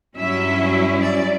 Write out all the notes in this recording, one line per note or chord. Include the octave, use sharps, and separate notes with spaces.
G2 F#3 C#4 E4 E5
D5